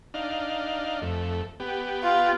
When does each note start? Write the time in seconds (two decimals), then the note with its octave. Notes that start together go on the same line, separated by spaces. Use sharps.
0.14 D4 D#4 F5
1.02 F2 A3
1.60 B3 G4
2.03 F4